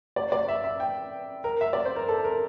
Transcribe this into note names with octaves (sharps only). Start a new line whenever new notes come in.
D5
D5
E5
E5
G5
A#4
E5
D5
C5
A#4
A4
A#4